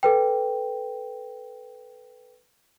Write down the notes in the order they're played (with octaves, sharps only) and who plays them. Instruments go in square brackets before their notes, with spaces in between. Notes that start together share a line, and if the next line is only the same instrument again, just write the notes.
[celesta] A4 B4 G5